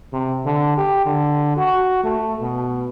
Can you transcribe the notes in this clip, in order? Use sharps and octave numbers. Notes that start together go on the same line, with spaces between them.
C3
D3
G4
D3
F#4
A3
B2